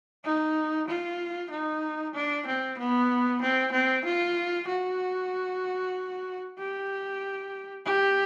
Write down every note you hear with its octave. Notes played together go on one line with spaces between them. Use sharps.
D#4
F4
D#4
D4
C4
B3
C4
C4
F4
F#4
G4
G4